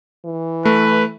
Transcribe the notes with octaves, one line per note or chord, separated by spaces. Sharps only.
E3
A3 B4